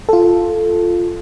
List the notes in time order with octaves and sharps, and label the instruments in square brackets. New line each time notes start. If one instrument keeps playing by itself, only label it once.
[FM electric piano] F4 A4